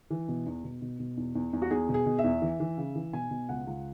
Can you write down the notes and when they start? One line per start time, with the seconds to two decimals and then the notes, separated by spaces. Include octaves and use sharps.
0.10 E3
0.28 B2
0.46 E2
0.64 B2
0.82 B2
1.00 B2
1.17 E2
1.35 E2
1.53 E2
1.62 F#4
1.71 E2 G#4
1.89 B2
1.94 G#4
2.06 B2
2.19 E5
2.24 E2
2.42 E3
2.60 E3
2.77 C#3
2.95 E3
3.13 B2 G#5
3.31 B2
3.49 C#2 F#5
3.67 C#2